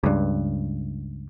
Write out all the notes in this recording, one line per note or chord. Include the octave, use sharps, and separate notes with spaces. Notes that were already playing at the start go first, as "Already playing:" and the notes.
C#2 G2